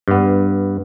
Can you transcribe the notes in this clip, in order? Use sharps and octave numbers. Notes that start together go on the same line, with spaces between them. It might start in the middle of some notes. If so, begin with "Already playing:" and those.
G2 B3